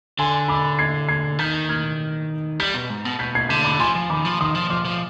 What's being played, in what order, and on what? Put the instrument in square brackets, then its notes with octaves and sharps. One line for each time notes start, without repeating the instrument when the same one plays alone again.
[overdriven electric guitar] D3 [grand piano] G#5 C6
[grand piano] B5 D6
G#6 C7
G#6 C7
[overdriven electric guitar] D#3 [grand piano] G6 B6
[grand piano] F6 G#6
[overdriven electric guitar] G3 [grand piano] G6 B6
[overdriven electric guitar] B2
G#2
B2
[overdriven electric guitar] B2 [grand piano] G6 B6
[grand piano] G#6 C7
[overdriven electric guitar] D3 [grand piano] G6 B6
[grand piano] B5 D6
[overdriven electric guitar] F3 [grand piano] G#5 C6
[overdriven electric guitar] F3
[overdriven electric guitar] D#3 [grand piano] B5 D6
[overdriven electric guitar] F3
[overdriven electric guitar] D#3 [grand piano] C6 D#6
[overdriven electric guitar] F3
[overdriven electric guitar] F3 [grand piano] D6 F6
[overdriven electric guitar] F3